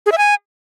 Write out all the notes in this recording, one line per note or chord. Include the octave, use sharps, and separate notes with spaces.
G#4
E5
G#5